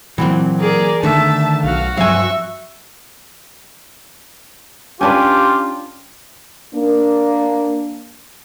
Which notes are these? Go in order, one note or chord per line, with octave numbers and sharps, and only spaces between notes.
A#2 E3 F#3 C4
G#4 A#4 D5
D3 D#3 A3 E5 A5
B1 F#4 F5
G2 F3 F#3 E5 F5 G#5 C#6
C#4 D4 F4 G4 B4
A#3 D4